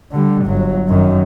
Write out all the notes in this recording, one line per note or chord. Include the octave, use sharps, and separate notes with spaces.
D3 G3
G1 F#3
F#2 D#3